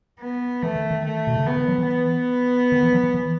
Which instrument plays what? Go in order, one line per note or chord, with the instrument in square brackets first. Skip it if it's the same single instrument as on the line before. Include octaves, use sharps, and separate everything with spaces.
[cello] B3
[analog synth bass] E3 [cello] A3
[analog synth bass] D#3
D#3
[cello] A3
[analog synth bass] B2
C#3
[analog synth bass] D#3 [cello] B3
[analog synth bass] D#3
F#3
E3
[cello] B3
[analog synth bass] D#3
E3
F#3
E3
E3